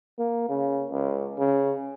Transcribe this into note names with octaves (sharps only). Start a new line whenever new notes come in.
A#3
C#3
C#2
C#3